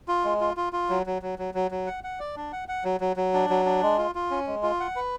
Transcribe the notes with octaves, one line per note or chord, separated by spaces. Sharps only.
F4
G#3
F4
F4
F4
F#3
F#3
F#3
F#3
F#3
F#3
F#5
F#5
D5
D4
F#5
F#5
F#3
F#3
F#3
D4
F#3
D4
G#3
F4
F4
C#4
G#3
F4
F#5
B4